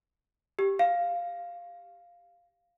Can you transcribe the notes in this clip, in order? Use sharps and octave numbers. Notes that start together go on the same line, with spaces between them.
G4
F5